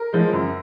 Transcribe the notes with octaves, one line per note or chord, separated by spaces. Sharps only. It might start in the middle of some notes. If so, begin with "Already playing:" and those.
Already playing: A#4
F3 G#3
F#2